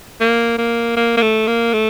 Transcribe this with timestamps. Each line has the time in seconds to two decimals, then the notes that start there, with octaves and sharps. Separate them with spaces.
0.21 A#3
0.58 A#3
0.96 A#3
1.17 A#3
1.22 A3
1.47 A#3
1.73 A3